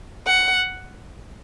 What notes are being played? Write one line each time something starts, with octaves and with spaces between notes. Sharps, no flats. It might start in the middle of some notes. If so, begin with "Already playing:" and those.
F#5